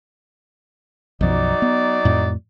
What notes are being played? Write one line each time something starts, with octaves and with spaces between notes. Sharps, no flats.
B1 F#2 F3 F#3 D#4 D5
B3
F2 A2